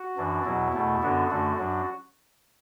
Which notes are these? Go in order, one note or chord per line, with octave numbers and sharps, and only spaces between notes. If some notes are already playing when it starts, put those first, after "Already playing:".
Already playing: F#4
F#2 E3 D4
E2 B2 F#3 E4
E2 B2 A3
F#2 D3 B3 D4 F#4
F#2 D3 A3 D4 F#4
F#2 F#3 D4